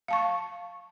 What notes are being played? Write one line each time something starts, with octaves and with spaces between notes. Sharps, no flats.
F5 A5 C#6